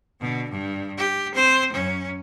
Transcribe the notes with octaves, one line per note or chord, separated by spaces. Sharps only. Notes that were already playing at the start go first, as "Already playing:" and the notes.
B2 D3
G2
G4
C4 C5
F#2 C#4